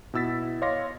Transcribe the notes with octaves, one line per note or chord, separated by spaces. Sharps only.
B2 E4 E6 A6 B6
C#5 D#5 F5 C6 D6 A#6